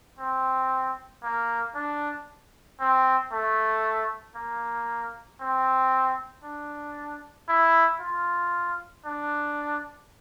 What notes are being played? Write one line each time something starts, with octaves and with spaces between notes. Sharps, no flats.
C4
A#3
D4
C4
A3
A#3
C4
D4
E4
F4
D4